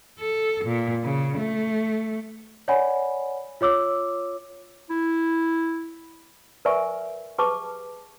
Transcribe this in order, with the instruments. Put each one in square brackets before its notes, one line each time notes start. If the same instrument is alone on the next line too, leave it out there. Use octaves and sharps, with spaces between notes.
[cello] A4
A#2
C#3
A3
[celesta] C#5 D5 F#5 G#5 B5
F4 C#5 D6 E6
[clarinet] E4
[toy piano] A#4 B4 D5 E5 G#5 C#6
G4 G#4 B4 A5 C#6 D6